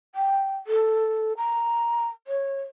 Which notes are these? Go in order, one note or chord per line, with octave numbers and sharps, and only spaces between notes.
G5
A4
A#5
C#5